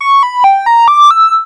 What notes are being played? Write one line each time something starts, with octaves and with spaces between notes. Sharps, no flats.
C#6
B5
G5
A#5
D6
E6